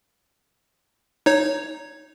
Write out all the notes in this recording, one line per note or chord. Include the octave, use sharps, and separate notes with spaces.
D#4 C#5